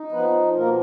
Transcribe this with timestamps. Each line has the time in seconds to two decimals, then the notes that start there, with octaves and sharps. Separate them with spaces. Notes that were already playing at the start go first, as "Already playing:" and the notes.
Already playing: D#4
0.12 F3 B3 B4
0.56 B2 A#3 A#4